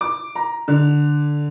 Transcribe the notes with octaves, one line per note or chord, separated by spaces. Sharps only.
D6
A#5
D3